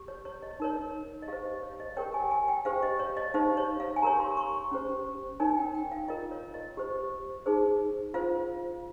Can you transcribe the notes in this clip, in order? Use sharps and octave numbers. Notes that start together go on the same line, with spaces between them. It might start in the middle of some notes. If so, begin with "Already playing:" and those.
Already playing: G4
C#5
C#5
D#5
D#4 A#4 C#5
D#5
G4 C5 F5
D#5
C#5
D#5
G4 A#4 C#5 G5
G#5
G#5
G5
G4 C5 F5
D#5
C#5
D#5
D#4 G4 C5 F5
C#5
F5
G#5
G4 A#4 C#5 A#5
C6
C#6
C#4 G4 C5
D#4 A#4 C#5 G#5
G5
G5
F5
F4 A#4 C#5 D#5
C#5
D#5
G4 C5
D#4 G#4 C5
F4 C5 F5